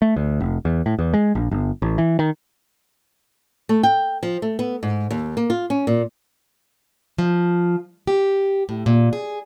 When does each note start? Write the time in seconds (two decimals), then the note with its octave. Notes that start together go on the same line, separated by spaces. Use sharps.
0.02 A3
0.16 D2
0.40 F1
0.65 E2
0.86 A2
0.99 E2
1.14 G#3
1.35 A#1
1.51 G1
1.82 A1
1.98 E3
2.19 D#3
3.69 A3
3.83 G5
4.23 F3
4.42 A3
4.59 B3
4.83 G#2
5.11 D#2
5.37 A#3
5.50 F4
5.70 C#4
5.87 A#2
7.18 F3
8.07 G4
8.69 A2
8.86 A#2
9.13 G#4